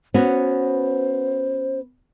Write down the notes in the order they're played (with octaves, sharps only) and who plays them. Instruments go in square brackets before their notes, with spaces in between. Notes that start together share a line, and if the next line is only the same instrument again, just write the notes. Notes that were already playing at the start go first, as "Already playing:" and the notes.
[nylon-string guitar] B3 C#4 F#4 [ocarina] C5